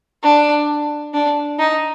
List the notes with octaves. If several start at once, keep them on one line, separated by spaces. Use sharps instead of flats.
D4
D4
D#4